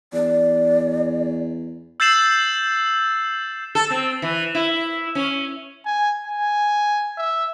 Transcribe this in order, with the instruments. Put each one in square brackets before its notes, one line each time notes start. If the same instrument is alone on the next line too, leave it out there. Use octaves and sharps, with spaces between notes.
[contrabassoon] E2 [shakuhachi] D5
[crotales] E6 G6 A6 C7 E7 F#7
[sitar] A4
C4
E3
E4
C#4
[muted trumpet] G#5
G#5
E5